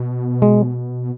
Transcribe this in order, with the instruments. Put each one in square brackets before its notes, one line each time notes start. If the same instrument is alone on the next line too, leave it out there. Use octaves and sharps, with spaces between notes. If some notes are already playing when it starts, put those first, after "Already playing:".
Already playing: [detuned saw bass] B2
[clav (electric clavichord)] G#3